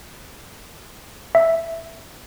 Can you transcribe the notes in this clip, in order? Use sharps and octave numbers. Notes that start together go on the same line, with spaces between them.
E5